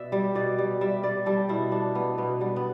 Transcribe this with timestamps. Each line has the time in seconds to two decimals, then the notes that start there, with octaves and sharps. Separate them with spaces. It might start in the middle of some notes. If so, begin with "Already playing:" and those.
Already playing: B2 D5 E5
0.12 G3
0.35 B2 D5
0.58 G3
0.81 G3 E5
1.03 G3 D5
1.26 G3 A4
1.49 B2 E4
1.72 G3 D4
1.95 B2 B3
2.18 B2 B3
2.41 G3 B3
2.56 B3